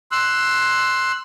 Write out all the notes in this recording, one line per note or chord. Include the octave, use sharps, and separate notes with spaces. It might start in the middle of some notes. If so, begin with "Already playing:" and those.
C6 E6 F#6